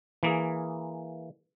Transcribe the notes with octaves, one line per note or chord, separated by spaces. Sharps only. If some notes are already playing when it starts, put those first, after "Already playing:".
E3 A#3 G#4